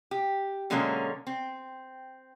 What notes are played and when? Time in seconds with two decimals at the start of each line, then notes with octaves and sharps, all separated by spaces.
0.11 G4
0.70 B2 D3 F#3 G#3 A#3 C#4
1.27 C4